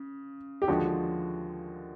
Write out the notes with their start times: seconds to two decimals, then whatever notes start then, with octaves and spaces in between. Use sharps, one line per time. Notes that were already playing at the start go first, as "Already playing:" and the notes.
Already playing: C#3
0.62 G4
0.67 D#2 D3 F3 G#3 F#4